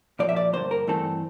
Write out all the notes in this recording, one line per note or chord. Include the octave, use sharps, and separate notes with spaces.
A#2 F3 A#3 D5
E5
D5
G2 D3 F3 A#3 C5
A#4
G2 E3 A3 C4 A4